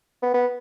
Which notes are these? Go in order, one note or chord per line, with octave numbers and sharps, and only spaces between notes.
B3
B3